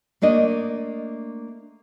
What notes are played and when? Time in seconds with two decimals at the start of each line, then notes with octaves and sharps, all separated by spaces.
0.22 A3 A#3 D4 D#5